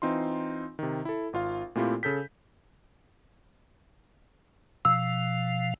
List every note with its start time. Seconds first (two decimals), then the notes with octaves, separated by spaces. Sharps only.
0.02 E3 C4 D#4 F4 C6
0.79 C3 D#3
1.05 E4 A4
1.33 G#1 F4 F5
1.75 A#2 A3 C4 E4 F4 G4
2.03 C#3 A4 G6 B6
4.85 B2 F3 F5 E6